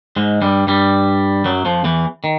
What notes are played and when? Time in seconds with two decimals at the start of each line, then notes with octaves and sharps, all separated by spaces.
0.16 G#2 G#3
0.42 G2 G3
0.67 G2 G3
1.45 F#2 F#3
1.65 F2 F3
1.84 E2 E3
2.24 D#3